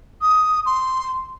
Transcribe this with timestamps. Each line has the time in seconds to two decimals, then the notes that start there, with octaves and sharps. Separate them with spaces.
0.22 D#6
0.66 C6